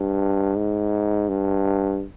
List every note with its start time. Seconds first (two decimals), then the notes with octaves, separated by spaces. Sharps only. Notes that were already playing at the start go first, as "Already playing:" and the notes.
Already playing: G2
0.57 G#2
1.28 G2